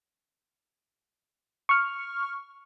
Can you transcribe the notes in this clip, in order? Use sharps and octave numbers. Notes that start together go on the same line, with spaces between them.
C#6 F6